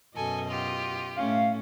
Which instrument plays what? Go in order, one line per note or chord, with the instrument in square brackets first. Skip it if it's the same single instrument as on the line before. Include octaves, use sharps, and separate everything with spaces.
[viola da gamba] F#2 B2 D#5 [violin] A4 G#5
[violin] F4 G4
[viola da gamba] A2 A3 C#4 [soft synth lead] F5